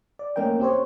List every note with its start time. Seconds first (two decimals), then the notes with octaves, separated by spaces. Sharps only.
0.19 D5
0.36 A3 A#3 C#4 A#4 D#5 G5
0.60 C4 G4 C5 C#5